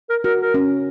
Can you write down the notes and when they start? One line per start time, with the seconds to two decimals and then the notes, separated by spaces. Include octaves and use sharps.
0.10 A#4
0.24 F#4 A#4
0.42 A#4
0.54 C#4